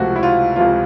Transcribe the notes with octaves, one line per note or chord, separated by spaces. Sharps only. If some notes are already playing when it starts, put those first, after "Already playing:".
Already playing: C#2 C3 F3 A3 F#4
E4
F4
C#2 C3 F3 A3 F4